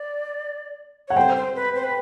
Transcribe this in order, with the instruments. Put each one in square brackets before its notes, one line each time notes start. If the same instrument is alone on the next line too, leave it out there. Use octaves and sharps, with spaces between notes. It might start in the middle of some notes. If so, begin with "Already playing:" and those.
Already playing: [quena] D5
[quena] C#5 [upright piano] F#5
[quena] C5 [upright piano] G5
[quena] C5
B4
C5
B4